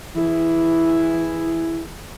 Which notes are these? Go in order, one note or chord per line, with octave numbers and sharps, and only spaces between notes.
E3 E4 G#4